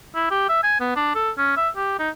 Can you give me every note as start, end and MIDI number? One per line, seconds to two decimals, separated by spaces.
0.15 0.27 64
0.31 0.45 67
0.49 0.62 76
0.63 0.76 80
0.80 0.93 59
0.96 1.12 62
1.15 1.31 69
1.38 1.57 61
1.57 1.69 76
1.76 1.98 67
1.99 2.09 63